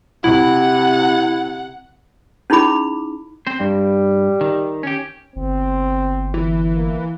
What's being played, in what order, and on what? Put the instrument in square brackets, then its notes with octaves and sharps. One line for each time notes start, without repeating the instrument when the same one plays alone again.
[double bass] C3 [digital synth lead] E4 [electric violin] F#5
[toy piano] C#4 D#4 E4 G#4 B5 D6
[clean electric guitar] C4 C5
[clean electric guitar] G2 [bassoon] G3
[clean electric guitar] D#3
C#4 G4
[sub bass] G1 [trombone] C4
[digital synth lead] E3
[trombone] A#3